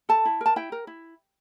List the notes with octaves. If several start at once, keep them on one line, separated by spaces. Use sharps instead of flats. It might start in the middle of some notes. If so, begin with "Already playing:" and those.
A4 A5
E4
A#4 A5
E4 G5
A#4
E4